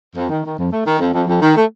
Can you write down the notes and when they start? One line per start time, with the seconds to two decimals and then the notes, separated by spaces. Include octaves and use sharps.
0.16 F2
0.30 D#3
0.44 D#3
0.58 F2
0.72 A3
0.86 D#3
0.99 F2
1.14 F2
1.27 F2
1.41 D#3
1.56 A3